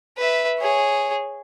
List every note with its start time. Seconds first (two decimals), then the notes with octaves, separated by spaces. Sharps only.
0.17 B4 E5
0.59 G#4 C#5